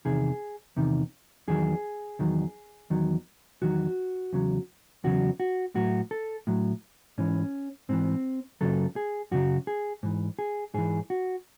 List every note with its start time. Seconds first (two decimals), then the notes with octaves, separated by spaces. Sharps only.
0.05 E2 C3 D#3 G#4
0.77 E2 C3 D#3
1.48 E2 D#3 F#3 G#4
2.19 E2 D#3 F#3
2.90 E2 D#3 F#3
3.62 E2 D#3 F#3 F#4
4.33 E2 C#3 F#3
5.04 E2 C#3 F#3 F#4
5.40 F#4
5.75 A2 F#3 F#4
6.11 A4
6.47 A2 F#3
7.18 G#2 E3 C#4
7.89 G#2 E3 C4
8.61 F#2 C#3 F#3 A4
8.96 G#4
9.31 F#2 C#3 F#3 F#4
9.67 G#4
10.03 G#2 E3
10.39 G#4
10.74 G#2 E3 G#4
11.10 F#4